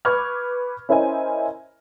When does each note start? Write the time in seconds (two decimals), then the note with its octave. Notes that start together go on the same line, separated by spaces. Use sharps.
0.05 B4 B5 C#6 D6 F6 G#6
0.89 C#4 E4 A#4 C5 D#5 G#5